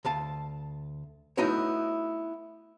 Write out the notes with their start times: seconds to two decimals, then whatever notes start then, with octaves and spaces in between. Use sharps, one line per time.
0.05 D2 F5 A5
1.37 A3 B3 D#4 E4 F#4 C#5